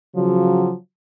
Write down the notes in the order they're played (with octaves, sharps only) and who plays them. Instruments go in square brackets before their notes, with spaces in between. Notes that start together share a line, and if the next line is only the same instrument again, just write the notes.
[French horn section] C#3 F3 F#3